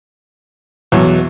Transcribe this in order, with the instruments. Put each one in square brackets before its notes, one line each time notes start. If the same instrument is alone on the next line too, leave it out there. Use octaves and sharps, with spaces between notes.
[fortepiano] E2 F#3 [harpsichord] B2